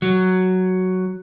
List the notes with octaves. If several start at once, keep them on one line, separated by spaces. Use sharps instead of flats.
F#3